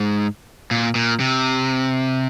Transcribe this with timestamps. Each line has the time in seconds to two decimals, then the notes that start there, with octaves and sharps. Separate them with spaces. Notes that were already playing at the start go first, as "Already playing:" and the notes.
Already playing: G#2
0.71 A#2
0.95 A#2
1.20 C3